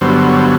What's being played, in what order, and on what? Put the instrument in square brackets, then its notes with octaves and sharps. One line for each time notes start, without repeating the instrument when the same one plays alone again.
[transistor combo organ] G2 D3 F#3 B3 C5
C5
C#5
C5